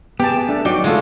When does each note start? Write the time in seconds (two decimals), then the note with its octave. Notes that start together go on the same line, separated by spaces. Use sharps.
0.20 B3 G4 G#4 G5 A5
0.49 A3 D4
0.65 F#3 D#4 F#4 D5 G5 D6
0.84 D3 G#3 A3 F4 A4